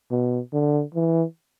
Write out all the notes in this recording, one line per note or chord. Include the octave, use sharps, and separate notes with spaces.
B2
D3
E3